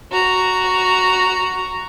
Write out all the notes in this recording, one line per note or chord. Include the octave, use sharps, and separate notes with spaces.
F#4 A#5